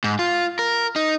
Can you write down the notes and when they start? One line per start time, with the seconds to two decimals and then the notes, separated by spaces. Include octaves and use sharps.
0.04 G#2
0.19 F4
0.59 A#4
0.96 D#4